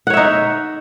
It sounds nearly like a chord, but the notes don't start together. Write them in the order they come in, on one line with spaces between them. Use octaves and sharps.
F#5 C#5 E5 D#4